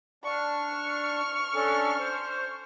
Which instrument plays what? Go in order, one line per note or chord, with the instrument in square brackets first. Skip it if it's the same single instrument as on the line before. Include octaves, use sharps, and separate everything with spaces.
[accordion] D4 [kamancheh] C#6 F6
[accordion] C#4 D4 A4
C5